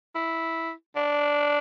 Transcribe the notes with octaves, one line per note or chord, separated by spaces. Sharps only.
E4
D4